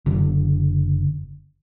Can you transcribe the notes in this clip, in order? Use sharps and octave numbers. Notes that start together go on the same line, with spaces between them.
F#1 D3